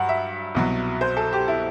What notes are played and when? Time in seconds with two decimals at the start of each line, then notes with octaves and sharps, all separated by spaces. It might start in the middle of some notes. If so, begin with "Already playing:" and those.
Already playing: G2 F#3 F#5
0.09 E5
0.55 C2 B2 F#3
1.01 C5
1.17 A4
1.33 G4
1.48 E4